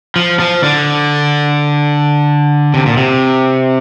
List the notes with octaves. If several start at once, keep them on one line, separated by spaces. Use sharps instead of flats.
F3
F3
D3
C3
A#2
C3